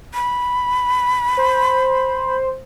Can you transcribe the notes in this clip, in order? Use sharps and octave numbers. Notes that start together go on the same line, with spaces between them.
B5
C5